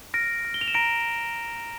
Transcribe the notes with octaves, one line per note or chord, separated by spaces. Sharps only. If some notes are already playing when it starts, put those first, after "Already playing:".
F6 A#6 D7
F6
G7
F7
E7
A#5 A#6 D7